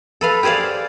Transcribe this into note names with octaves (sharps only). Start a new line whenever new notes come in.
A4 B4 F5
G4 G#4 C5 D5 F5